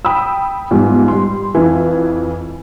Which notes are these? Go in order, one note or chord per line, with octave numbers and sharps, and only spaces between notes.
G5 B5 D#6 E6
E2 G#2 F3 G3
G3 C6
F2 E3